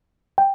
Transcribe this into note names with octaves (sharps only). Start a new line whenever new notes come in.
G5